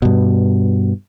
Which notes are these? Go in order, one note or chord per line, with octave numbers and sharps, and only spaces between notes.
G2 B2